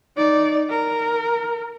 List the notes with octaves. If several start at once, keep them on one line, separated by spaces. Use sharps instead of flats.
D#4 D5
A#4